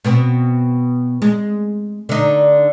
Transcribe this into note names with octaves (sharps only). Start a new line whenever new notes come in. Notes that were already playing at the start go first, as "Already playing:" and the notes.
B2 B3 C4
G#3
D3 D#4